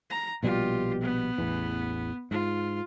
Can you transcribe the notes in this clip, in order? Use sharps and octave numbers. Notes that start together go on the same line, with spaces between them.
A#5
A#1 B2 G3 F4 G4
B3
A1 E2 E3
G#2 F4